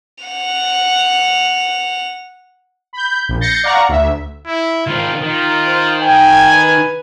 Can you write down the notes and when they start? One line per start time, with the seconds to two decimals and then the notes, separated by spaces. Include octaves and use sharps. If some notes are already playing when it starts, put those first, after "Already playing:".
0.25 F#5 F7
2.93 B5 G6
3.29 A#1
3.41 G6 A6 A#6 C7 C#7
3.64 D5 F5 F#5 A#5 C#6
3.89 D2 E5
4.47 E4
4.87 D#3 C4 F4
5.21 D#3 F4
5.67 C5
6.02 G5 G#5
6.55 B4